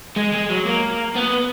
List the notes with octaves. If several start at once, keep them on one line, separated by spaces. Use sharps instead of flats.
G#3
G#3
F#3
A#3
B3